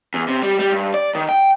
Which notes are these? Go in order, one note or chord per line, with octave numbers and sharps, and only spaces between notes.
E2
C3
G3
G3
G2
D5
D#3
G5